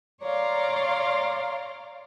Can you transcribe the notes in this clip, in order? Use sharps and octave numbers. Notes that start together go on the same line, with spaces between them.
C#5 D5 F5 A#5 C6